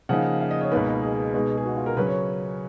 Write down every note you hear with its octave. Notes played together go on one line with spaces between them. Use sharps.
C#3 F3 A#3 D#4 F#5
F5
D#5
C#5
C#2 B2 A#3 D#4 B4
G#4
B2 G#3 D#4
G#4
F#4
F4
A#4
C#3 F#3 C#4 B4
C#5